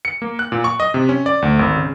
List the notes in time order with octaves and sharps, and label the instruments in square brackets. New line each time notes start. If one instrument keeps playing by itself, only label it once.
[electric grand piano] C#7
A#3
F#6
A#2
C#6
D#5
C3
C#4
D5
D2
G#1
C#3